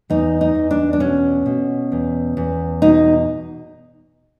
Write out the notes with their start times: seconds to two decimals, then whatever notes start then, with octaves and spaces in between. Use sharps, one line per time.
0.10 E2 D#4
0.41 D#4
0.55 E2
0.71 D4
0.93 D4
1.00 B2 C#4
1.46 B2
1.92 E2
2.37 E2
2.82 B2 D#4